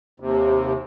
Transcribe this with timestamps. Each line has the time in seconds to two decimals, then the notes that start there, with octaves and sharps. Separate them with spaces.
0.20 D#2 C3